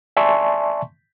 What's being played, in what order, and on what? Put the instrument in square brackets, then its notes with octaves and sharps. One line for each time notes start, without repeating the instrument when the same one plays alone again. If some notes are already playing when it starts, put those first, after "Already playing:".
[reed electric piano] D5 E5 G#5 A5 C6 C#6